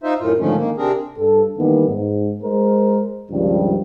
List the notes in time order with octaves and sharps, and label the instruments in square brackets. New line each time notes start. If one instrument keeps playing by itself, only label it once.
[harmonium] D#4 F4 C5 E5
F#2 A2 F4
G#2 D3 D#3 F3 A3 C#4
D#3 A#3
C3 C4 D4 G#4 A#4
[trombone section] G2 A4
D#3 E3 G3 A#3 B3
G#2
G#3 A#4 C5
C#2 G2 D#3 F3 G3